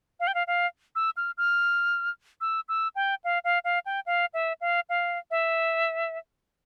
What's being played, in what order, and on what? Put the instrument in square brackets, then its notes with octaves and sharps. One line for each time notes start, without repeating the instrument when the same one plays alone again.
[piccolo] F5
G5
F5
F5
E6
F6
F6
E6
E6
G5
F5
F5
F5
G5
F5
E5
F5
F5
E5